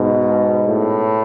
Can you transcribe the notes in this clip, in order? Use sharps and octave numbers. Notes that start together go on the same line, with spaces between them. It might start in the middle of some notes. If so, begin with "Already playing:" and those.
Already playing: G#2 B2
A2